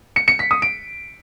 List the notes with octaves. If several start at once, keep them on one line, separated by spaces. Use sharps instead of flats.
C#7
C#7
B6
D#6
D7